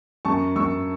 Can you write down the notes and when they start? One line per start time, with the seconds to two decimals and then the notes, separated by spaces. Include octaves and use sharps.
0.25 F#2 A5 C#6
0.56 F#2 C#6 E6